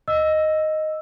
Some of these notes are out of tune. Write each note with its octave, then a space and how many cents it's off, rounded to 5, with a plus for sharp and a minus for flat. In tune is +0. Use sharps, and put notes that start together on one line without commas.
D#5 +0 E6 +0